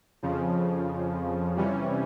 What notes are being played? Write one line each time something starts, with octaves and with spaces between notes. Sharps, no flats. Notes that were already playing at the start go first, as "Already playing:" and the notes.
F2 C#3 F3
C3 E3 G3 C#4